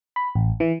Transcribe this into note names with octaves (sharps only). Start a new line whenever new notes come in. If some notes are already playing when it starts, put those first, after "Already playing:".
B5
A1
E3